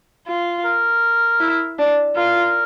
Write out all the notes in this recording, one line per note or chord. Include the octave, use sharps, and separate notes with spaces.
F4
A#4
E4
D4
F4 A#4